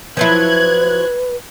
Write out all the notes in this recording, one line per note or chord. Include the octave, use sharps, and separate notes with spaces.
F3 F#3 E4 B4 F#6 G#6